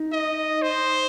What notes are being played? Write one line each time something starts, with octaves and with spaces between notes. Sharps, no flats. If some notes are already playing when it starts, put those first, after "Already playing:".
Already playing: D#4
D#5
C5